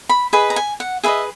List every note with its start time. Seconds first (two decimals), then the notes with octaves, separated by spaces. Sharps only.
0.09 B5
0.33 G#4 B4 D#5 B5
0.50 A#5
0.56 G#5
0.80 F#5
1.04 G#4 B4 D#5 E5